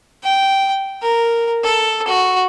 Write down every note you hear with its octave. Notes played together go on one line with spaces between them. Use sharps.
G5
A#4
A4
F#4